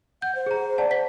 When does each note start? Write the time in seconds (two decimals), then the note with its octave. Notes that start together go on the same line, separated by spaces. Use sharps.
0.22 F#5 G6
0.35 C5
0.46 G#4 A#5
0.78 D5 F#5 A5
0.91 B6